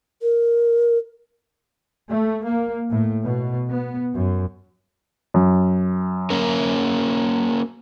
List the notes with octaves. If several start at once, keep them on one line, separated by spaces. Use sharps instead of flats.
A#4
A3
A#3
A2
B2
B3
F#2
F#2
A#3 C#4 A#4